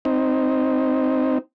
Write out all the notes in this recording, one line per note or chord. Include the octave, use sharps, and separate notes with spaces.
C4 D#4